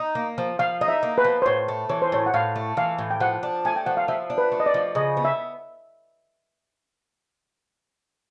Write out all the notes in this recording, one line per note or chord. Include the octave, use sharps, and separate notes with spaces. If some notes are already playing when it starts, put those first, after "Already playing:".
Already playing: D#4
A#3
F3
F3 F5
D#4 D#5
E5
A#3
B4
F3
C5
A2 C#5
A3
E3 C#5
C5
A2 C#5
F#5
A2 F5
A3
E3 F5
A2
G5
F3 F#5
D4
A3 G#5
G5
F3 F#5
F5
F3 E5
D4
B4
A3
D#5
D5
F3
C#3 D#5
B3
E5